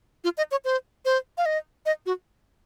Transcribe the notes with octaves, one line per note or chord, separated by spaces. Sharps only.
F4
D#5
C#5
C5
C5
F5
D#5
D#5
F#4